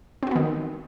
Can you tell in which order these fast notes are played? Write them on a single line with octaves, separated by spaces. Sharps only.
C4 F#4 B3 D#3